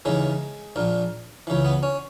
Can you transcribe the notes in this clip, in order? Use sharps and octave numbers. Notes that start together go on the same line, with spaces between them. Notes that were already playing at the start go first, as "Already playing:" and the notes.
D#2 C#3 E3 G#3
A#1 A#2
C#2 C#3 E3
B3
C#4